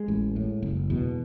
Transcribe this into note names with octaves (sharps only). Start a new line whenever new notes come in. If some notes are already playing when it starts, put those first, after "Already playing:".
Already playing: G#3
A1
A2
F#1
E2 B2